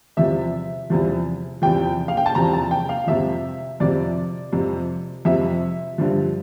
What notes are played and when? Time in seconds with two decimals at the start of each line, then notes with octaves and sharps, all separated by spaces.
0.17 E2 C3 F3 E5
0.90 E2 C3 F3
1.62 E2 C3 F3 G5
2.08 F5
2.17 G5
2.26 A5
2.35 E2 C3 F3 A#5
2.53 A5
2.71 G5
2.89 F5
3.07 F2 C3 F3 E5
3.80 F2 C3 F3 D5
4.53 F2 C3 F3
5.25 F2 C3 F3 E5
5.98 G2 D3 F3